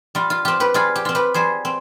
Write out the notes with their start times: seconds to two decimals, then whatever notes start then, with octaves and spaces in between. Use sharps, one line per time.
0.15 G3 F4
0.30 F4
0.45 C4 F4 G4
0.60 G4 B4
0.74 G3 F4 G#4
0.96 G4
1.05 C4 F4
1.15 G4 B4
1.34 G3 G#4 C5
1.65 C4